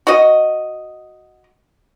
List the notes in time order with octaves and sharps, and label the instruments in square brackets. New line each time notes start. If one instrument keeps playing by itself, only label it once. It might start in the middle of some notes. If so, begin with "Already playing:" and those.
[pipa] F#4 D#5